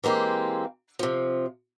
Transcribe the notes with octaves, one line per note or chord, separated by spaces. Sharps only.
E3 G#3 A#3 C4 G4
C3 F3